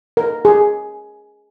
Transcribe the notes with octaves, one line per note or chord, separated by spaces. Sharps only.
A#4
G#4